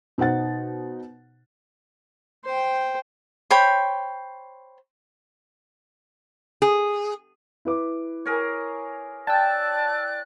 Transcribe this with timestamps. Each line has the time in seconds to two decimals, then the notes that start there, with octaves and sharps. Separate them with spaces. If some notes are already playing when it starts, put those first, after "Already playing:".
0.18 B2 D#4 C5 F#5 A6
2.45 C5 G5
3.50 C5 C#5 G5 B5
6.62 G#4
7.65 E4 B4 D6
8.26 G#4 A#4 C#5
9.27 D5 G5 A5 E6 F#6